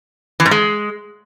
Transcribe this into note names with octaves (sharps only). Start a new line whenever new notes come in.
E3
G#2
G#3